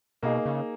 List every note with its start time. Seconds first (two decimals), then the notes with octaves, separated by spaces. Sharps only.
0.23 B2 A#3 D#4 G#4
0.46 C#3